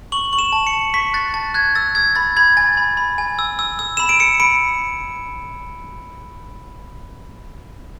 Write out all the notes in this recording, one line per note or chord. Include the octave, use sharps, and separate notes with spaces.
C#6 F#7
C#6 F#7
E7
A5
C#7
A5
C#6 B6
F#6 A6
A5 A6
F#6 G#6
E6 A6
E6 G#6
B5 A6
B5 G#6
G#5 A6
B5
B5
G#5
E6
E6
E6
B5 E7
D7
E6 C#7
B5 D7